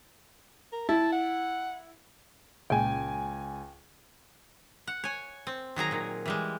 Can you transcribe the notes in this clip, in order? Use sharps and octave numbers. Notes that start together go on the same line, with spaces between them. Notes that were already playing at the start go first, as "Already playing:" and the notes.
A#4
E4 A5
F#5
C#2 A#2 C#3 G#3 G5 G#5
F#5
C#5 G#5
C4
D#3 F#3 G#4 A#5
A#2 D#3
E3 G3 G#3